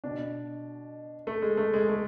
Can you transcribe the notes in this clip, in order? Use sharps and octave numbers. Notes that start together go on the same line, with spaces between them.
B2 D4
A3
G#3
A3
G#3
A3